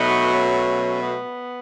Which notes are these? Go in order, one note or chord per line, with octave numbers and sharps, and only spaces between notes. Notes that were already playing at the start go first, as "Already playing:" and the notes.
Already playing: B2 F#3 A3 B3 D#4
C#4
B3